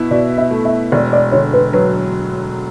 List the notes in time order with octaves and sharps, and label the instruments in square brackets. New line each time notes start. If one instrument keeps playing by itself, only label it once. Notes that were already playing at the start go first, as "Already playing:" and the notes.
Already playing: [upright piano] B2 E4
[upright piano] B2 [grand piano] D5
[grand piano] E5
[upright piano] A3
[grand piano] E5
[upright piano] E1 [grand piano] D5
[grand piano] D5
[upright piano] D3 [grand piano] C#5
[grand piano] B4
[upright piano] F#3 [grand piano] B4